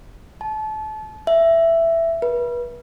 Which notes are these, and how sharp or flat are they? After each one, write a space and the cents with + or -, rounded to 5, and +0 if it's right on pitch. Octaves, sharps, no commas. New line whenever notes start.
A5 -30
E5 +10
B4 -35